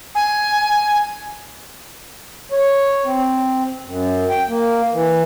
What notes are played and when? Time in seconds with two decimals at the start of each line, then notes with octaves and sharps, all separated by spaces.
0.15 G#5
2.52 C#5
3.05 C4
3.84 F#2
4.30 G5
4.48 A#3
4.92 E3